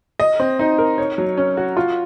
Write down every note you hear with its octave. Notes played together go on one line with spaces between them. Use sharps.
D#5
C4
D#4
A#4
C#5
F#3
C#4
F#4
F4